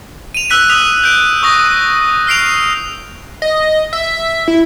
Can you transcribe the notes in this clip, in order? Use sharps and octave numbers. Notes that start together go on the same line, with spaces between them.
D#7 F7
E6 F#6 B6 D#7
D#6 B6 F7
G6 D7
C#6 D#6 A#6
F6 C7 D7 F7
D#5
E5
E4